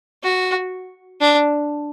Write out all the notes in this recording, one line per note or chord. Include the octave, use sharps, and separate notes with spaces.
F#4
D4